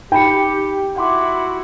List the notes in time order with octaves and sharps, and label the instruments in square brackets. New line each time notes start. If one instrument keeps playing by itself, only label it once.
[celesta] D#4 B5 C#7 [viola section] G4 [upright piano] G5
[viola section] E4 F#4 [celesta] F#5 C6 D6